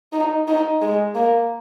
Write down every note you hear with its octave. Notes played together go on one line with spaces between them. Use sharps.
D#4
D#4
G#3
A#3